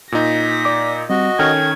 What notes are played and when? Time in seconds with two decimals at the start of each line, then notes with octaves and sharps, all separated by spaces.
0.12 A#2 D#4 A#6 B6
0.65 D5 D6
1.10 G3 C4 F#4 D#5
1.39 D#3 C#4 A4 G5 F6 G#6